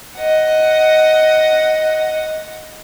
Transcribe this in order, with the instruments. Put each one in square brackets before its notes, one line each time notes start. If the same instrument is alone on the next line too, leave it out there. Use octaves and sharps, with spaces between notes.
[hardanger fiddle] D#5 F#5